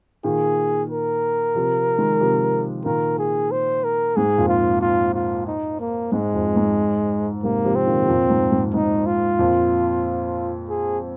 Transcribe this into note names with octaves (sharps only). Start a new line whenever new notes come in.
A#2 D#3 G#4
A#4
C3 F3
D#3 G#3
C3 F3
A#2 D#3 A#4
G#4
C5
A#4
G#2 G#4
F2 A#2
F4
F4
F4
D#4
A#3
G#2 G#3
F2
G#2
G#2 C3 A#3
C3 F3
C4
A#2 D#3
C3
F2 A#2
G#2
G#2
G#2 D#4
F4
F2 A#2
G#4